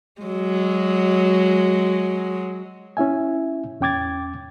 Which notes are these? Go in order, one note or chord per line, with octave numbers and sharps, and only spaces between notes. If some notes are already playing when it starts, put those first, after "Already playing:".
F#3 G#3
C#4 E4 E5 G#5
E2 C#4 G5 D6 G#6 A6